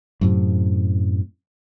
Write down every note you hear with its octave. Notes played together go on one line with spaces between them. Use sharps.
F#2 A2 C3